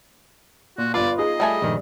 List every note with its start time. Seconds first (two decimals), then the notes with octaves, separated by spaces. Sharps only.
0.78 A#2 F#4
0.94 G1 F4 B4 D5 F5
1.18 D#4 G#4 D#5
1.40 G3 A3 G#5
1.62 A#1 G2 D#3